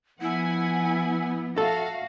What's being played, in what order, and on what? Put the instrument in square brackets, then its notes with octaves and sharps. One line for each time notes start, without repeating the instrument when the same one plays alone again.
[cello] F3 B3 [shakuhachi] E4 [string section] F#5 G#5
[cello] F#4 [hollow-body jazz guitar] A4 [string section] E5 F5